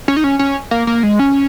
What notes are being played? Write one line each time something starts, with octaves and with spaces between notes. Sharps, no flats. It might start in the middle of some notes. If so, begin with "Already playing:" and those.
C#4
D#4
C#4
C#4
A#3
A#3
G#3
C#4